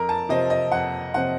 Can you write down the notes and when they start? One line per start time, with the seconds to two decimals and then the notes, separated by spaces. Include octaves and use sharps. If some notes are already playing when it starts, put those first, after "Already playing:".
Already playing: F2 A#4
0.09 A5
0.29 C3 F3 C4 D#5
0.50 D#5
0.71 F2 F#5
1.14 C3 F3 C4 F#5